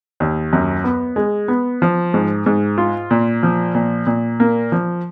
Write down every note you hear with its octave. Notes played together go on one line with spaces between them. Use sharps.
D#2
F#2
B3
G#3
B3
F3
G#2
G#2
F4
A#2
F3
A#2
A#2
A#3
F3